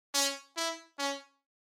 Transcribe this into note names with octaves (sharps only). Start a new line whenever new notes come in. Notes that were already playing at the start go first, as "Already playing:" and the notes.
C#4
E4
C#4